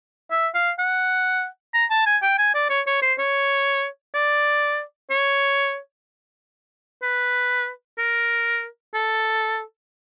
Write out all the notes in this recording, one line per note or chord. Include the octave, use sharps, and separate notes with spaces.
E5
F5
F#5
A#5
A5
G#5
G5
G#5
D5
C#5
C#5
C5
C#5
D5
C#5
B4
A#4
A4